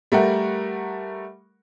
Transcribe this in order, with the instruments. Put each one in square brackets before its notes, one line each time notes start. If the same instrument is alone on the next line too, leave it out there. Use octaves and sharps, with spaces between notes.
[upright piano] G3 A3 A#4 F#5